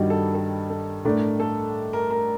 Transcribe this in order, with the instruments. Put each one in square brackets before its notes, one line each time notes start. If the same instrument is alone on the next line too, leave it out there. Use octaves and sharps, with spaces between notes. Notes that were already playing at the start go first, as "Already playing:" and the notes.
Already playing: [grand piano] G2 D#3 G3 [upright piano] F#4
[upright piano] A4
A4
A4
[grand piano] A2 A3 D4 [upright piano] A#4
[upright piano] A4
A#4
A#4